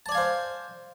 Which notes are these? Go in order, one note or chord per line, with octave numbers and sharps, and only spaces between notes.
C5 D5 F5 G#5 A5